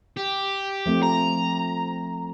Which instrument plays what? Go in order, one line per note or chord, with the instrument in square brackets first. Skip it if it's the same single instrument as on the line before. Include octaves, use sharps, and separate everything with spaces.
[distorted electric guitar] G4
[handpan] F3 A3 C4
[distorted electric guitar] A#5